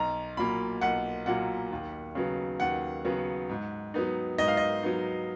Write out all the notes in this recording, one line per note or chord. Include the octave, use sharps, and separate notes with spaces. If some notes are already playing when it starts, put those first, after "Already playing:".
Already playing: B1 A#5
A#2 F#3 A#3 B5
B1 F#5
A#2 F#3 A#3 F#5
D#2
C#3 F#3 B3
D#2 F#5
C#3 F#3 B3
G#2
F#3 B3 D#4
G#2 D#5
F5
D#5
F#3 B3 D#4